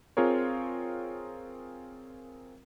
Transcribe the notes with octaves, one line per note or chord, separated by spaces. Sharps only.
C4 F4 G#4 A#4 C#5